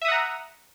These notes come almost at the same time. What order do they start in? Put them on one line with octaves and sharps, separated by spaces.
E5 D#6 F#5 A#5